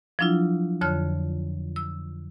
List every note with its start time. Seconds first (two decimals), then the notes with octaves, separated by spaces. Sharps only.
0.19 F3 F#3 D4 E4 F4
0.81 F2 D3 C#5 F6
1.76 E6